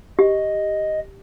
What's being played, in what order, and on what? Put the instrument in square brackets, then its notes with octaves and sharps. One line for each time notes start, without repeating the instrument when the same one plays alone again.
[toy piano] G4 [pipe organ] D#5